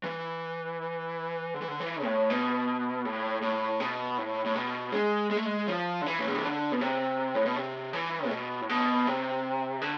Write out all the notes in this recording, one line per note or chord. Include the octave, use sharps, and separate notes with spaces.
E3
D3
E3
D3
E3
A2
B2
A2
A2
B2
A2
A2
B2
G#3
G#3
A3
G#3
F3
D3
E3
A2
B2
C3
D3
B2
C3
A2
B2
C3
E3
A2
B2
A2
B2
C3
D3